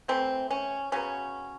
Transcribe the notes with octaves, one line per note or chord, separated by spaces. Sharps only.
E3 A3 C4
C#4
C#3 F#3 B3 C#4